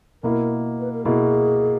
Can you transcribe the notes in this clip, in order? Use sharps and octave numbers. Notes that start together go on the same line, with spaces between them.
B2 A#3 E4 A#4
B4
A#4
B2 A#3 E4 G#4